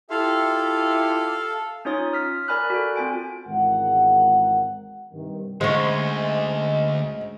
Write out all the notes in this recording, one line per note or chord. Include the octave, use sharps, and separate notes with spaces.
E4 F4 G4 A4 F5
C#4 D#4 F4 C#5 D#6 A6
F6 B6
A#4 D5 G#5 B5 F6 F#6
F#4 A4
C4 F4 G#5 D7
G#1 E2 G#3 A#4 F#5
G2 C3 D#3
D2 G#3 C#4 C5 D#5